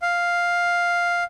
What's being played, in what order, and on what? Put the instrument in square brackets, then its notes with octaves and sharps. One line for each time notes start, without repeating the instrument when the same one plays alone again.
[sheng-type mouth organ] F5